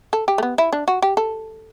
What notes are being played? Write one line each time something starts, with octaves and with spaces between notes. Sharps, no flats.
A4
G4
A3
B3
E4
D4
F#4
G4
A4